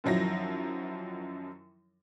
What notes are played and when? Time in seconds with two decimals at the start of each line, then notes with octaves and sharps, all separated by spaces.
0.04 F#2 D#3 F3 F#3 E4 A#6